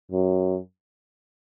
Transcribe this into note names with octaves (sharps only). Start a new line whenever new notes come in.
F#2